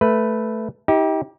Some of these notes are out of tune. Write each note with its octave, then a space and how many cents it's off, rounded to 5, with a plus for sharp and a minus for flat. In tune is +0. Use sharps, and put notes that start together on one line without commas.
A3 +0 B4 +0
D#4 +40 G4 +0